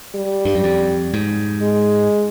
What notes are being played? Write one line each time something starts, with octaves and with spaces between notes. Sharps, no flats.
G3
G2
F#2
F2
G#2
G#3